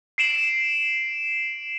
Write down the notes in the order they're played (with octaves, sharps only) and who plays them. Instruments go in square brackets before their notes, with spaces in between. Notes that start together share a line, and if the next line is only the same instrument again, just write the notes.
[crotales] C7 D7 E7 F#7